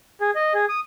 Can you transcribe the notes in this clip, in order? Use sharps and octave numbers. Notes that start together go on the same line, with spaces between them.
G#4
D#5
G#4
D#6